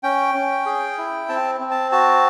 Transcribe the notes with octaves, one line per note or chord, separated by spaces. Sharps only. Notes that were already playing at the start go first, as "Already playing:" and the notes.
C#4 G5
C#4
G#4
E4
C4 A5
C4
A5
F#4 A5